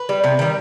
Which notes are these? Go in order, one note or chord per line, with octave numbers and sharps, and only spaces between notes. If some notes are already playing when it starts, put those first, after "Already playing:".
Already playing: B4
G3
C3
D#3 G3